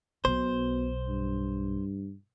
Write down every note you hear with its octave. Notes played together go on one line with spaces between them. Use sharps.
B1 B2 C5
G2